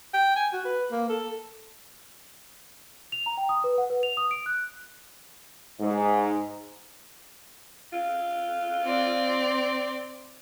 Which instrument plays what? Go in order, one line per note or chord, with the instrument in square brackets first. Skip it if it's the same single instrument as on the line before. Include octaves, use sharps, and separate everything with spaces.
[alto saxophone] G5
G#5
F#4
B4
A#3
A4
[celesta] F7
A#5
G5
D#6
B4
F#5
B4
F7
D#6
D7
F#6
[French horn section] G#2
[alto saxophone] F4
[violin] C4 D5